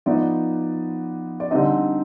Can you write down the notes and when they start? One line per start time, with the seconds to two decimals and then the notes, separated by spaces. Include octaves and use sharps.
0.06 F3 B3 D#4 D5
1.40 D5
1.51 D3 G3 C4 D#4 D#5